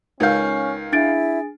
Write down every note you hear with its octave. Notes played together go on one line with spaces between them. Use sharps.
C#2 C#4 D#4 A#4 F5 G6
D4 E4 G#4 A6 D7